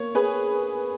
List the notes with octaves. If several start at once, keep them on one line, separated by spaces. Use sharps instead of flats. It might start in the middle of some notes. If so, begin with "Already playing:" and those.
Already playing: A#3 C#5
G#4 B4